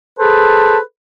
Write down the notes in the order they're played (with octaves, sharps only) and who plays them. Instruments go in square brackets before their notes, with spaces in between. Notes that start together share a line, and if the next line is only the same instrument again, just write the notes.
[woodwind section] G#4 A4 B4 C5 A5